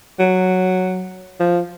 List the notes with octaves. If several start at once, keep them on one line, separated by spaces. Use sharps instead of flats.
F#3
F3